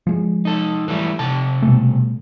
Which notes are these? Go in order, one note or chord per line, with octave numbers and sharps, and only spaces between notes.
F3 G#3
D#4 A4
E3 G3 A3
C3 A4 A5
B2 G3 A3